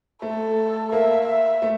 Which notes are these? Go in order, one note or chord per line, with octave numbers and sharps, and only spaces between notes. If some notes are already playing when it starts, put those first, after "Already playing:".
A3 A4
A#3 E5
E5
A3